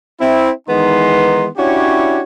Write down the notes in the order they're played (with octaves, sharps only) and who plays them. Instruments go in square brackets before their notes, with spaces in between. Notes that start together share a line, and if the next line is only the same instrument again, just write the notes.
[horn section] C4 E4
D#3 E3 G#3 B3 D#4 C6
C#4 D4 E4 F#4 G4 C#5